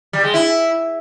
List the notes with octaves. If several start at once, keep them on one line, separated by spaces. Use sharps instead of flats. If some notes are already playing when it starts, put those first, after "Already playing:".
G3
G#3
E4